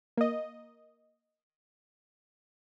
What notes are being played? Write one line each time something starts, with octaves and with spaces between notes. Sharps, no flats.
A#3 D#5